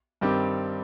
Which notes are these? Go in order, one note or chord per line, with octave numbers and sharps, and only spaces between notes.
G2 D#3 G3 C4 G4